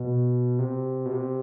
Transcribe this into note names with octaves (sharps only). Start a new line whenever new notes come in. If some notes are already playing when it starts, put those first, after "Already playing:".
Already playing: B2
C3
B2
C3